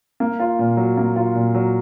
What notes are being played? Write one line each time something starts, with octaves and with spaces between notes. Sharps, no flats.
A#3
F4
A#2
F#3
A#3
F4
A#2
F#3